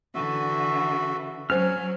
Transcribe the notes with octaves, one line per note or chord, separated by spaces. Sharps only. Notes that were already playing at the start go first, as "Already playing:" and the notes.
D3 E3 F#4 E5
F#3 C#4 C5 G#5 F6